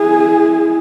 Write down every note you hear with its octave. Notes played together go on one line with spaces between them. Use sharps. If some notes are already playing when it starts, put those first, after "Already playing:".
Already playing: E4 G#4